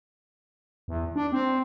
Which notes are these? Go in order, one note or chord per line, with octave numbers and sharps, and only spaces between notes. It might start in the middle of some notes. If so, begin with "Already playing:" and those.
E2
D4
C4